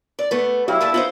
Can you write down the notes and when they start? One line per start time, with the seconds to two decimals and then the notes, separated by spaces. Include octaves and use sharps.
0.19 D5
0.31 A3 B3
0.68 F#3 E4 G4 F5
0.81 A#2 A3 A5
0.94 B3 D#4 F4 C5